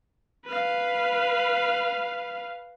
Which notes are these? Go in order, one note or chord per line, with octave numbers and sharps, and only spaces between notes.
B4 F5